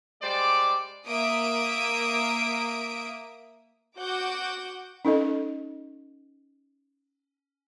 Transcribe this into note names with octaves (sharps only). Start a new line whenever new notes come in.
G3 G#3 C5 D5
A#3 E5 D#6 D7
F#4 F#5 D6 G6
C#4 D#4 A4 D#5